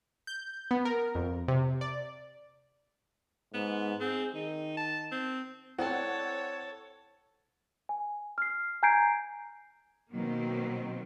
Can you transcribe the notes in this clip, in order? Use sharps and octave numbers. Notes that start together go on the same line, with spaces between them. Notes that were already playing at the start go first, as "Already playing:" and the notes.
G6
B3
A#4
F2
C3
D5
G#2 B3
C4 G#4
D#3 D#4
A5
C4
C4 E4 A4 C#5 D5 F#5 G5
G#5
F6 C7
G#5 A#5 G6 G#6 C7 D7
B2 D#3 F#3 A#3 C4